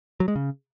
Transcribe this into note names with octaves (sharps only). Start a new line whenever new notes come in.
F#3
G#3
C#3